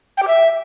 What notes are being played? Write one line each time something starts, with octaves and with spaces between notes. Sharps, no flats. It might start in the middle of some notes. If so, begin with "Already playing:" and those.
G5
G4
E5